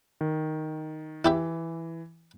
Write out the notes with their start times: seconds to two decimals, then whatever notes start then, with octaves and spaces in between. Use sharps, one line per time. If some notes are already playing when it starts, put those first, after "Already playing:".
0.21 D#3
1.25 E3 E4 G4 E5